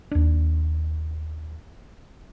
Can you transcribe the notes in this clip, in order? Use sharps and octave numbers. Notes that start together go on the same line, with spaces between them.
D#2 D4